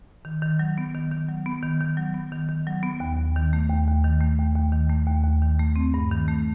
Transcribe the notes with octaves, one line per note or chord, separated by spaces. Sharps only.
D#3
D#3
F#3
B3
D#3
D#3
F#3
B3
D#3
D#3
F#3
B3
D#3
D#3
F#3
B3
D#2
D#2
D#3
A3
D#2
D#2
D#3
A3
D#2
D#2
D#3
A3
D#2
D#2
D#3
A3
C4
G2
D#3
A3